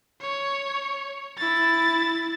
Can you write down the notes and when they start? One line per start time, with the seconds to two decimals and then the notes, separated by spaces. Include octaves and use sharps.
0.21 C#5
1.38 E4 A6